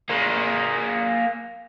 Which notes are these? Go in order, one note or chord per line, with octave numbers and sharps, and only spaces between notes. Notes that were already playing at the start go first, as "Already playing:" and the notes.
A#3 G#4